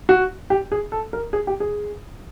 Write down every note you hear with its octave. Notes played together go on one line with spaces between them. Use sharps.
F#4
G4
G#4
A4
A#4
G#4
G4
G#4